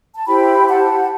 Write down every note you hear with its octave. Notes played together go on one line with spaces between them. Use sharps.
A5
E4 G4 C5 G5 B5
F#5 A5